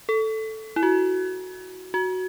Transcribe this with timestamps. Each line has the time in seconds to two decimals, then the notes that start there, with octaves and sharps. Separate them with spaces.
0.09 A4
0.76 E4
0.83 F#4
1.94 F#4